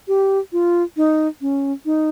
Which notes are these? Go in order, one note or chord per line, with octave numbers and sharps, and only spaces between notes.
G4
F4
D#4
C#4
D#4